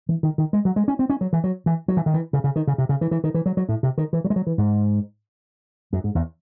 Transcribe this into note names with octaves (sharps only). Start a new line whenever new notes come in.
E3
D#3
D#3
G#3
F#3
G#3
C#4
C4
C#4
F#3
E3
F#3
E3
F#3
E3
D#3
E3
C#3
C#3
D#3
C#3
C3
C#3
E3
E3
D#3
E3
F#3
F#3
A2
C3
D#3
E3
F#3
G#3
F#3
E3
G#2
F#2
G#2
E2